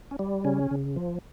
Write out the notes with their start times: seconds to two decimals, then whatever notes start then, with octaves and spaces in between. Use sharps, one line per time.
0.11 C#4
0.19 G3
0.45 C#3 C#4
0.71 C#3
0.96 F3